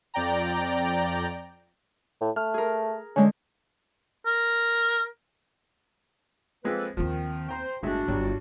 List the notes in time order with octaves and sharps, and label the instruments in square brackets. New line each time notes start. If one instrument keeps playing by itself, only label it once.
[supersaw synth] F2 D5 G5 A#5
[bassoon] A2
[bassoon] A3 [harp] F6
[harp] G#4 A#4
[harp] D3 G#3 [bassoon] C#4
[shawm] A#4
[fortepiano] F3 G#3 C4 [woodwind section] A#3 A4 B4
[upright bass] D#2 C4 [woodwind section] D#3 [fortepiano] F3
[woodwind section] C5 [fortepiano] G5 A#5 C6
[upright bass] G1 [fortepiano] A2 G#3 E5 [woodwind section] D4 F#4
[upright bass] G1 [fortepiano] F#3 G3